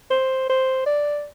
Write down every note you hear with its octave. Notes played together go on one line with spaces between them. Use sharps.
C5
C5
D5